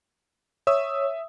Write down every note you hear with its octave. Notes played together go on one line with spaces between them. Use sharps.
C#5 E5 D#6 E6